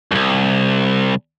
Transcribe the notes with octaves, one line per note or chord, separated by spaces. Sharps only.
C2 F#2